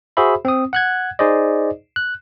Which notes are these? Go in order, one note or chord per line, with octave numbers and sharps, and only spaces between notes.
F#4 G#4 C5 E5 B5
C4 D#6
F#5 F#6 G#6
D#4 G#4 C5 D5 D#5
F#6